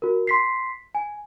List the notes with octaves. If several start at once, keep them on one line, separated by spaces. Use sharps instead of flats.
F#4 A#4
C6 B6 C7
G#5